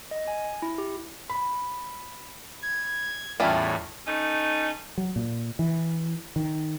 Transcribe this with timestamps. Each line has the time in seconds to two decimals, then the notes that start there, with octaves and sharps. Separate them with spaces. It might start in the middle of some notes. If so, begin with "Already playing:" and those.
0.11 D#5
0.28 G#5
0.62 E4
0.78 G4
1.30 B5
2.62 G#6
3.40 E2 A2 G3 C#4 F4 E5 A5 F6
4.07 A3 C#4 D#4
4.98 F#3
5.16 A#2
5.59 E3
6.36 D#3